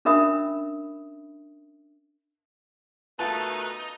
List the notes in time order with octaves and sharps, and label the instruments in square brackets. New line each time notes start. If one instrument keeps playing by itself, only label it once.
[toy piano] C#4 D4 A#4 E5 B5 D#6
[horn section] B2 D#3 A3 [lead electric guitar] D#4 [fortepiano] F4 A5 [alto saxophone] B4